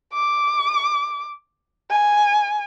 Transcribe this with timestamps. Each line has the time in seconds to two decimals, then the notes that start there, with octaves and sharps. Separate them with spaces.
0.13 D6
1.90 G#5